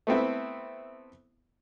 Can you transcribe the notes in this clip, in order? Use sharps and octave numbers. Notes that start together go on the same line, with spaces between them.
A3 B3 C4 E4